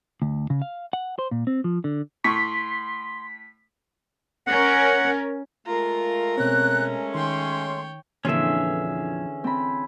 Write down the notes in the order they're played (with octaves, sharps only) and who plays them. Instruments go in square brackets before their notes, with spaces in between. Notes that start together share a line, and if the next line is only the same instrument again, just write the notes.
[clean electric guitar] D2
C#3
F5
F#5
C5
A#2
C4
F3
D3
[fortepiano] A2 [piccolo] C6 [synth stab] C#6 [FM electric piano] B6
[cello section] C#4 A#4 [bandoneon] F#5
[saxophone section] G#3 A3 F4 [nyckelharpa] A#4 A#5
[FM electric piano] B2 C4 [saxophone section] G#3 A3 C#4 [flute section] F#6
[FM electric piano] D#3 [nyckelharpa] C#5 G5 [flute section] C6
[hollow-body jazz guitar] F2 A#2 [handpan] D3 E3 [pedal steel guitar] C#4 G#4 E5
[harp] C4 B5